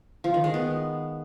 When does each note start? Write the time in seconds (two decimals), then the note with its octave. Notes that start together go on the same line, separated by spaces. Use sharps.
0.24 F3
0.34 D#3
0.44 G#3
0.54 B3